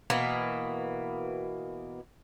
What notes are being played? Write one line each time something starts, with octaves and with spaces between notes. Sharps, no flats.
B2 E3 A#3 B3